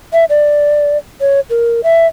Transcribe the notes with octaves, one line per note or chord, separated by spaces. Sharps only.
E5
D5
C#5
A#4
E5